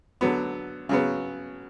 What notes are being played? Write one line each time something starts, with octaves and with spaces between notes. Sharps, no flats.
D3 F#3 B3
C#3 F#3 B3